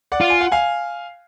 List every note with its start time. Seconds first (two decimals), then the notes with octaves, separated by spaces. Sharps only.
0.12 D5 F#5
0.21 F4
0.30 G#5
0.41 F#5
0.52 F5 G#5